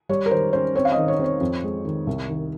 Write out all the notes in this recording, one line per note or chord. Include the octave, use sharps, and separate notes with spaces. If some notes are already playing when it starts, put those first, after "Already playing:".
G3 C#5
A#4
D#3 C5
C#4 C5
C4 C#5
F5
D#5
D#3
C#5
C4 C#5
F2
G#3
D#3
C2
D#3